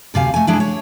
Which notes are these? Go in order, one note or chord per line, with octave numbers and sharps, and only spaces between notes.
D2 C3 F5 G#5
A3 G#5
G#3 D4 E4
C#5